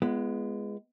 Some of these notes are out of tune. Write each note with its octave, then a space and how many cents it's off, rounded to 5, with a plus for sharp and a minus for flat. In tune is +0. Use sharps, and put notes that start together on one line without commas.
G#3 +0 B3 +0 F4 -35